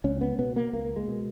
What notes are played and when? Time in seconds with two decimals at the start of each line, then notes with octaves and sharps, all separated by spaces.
0.04 C#2 C#4
0.21 B3
0.39 B2 B3
0.56 A#3
0.73 C#2 A#3
0.96 G#3
1.08 B2